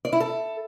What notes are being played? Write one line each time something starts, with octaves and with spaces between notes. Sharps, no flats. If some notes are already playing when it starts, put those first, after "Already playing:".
D5
E4
A4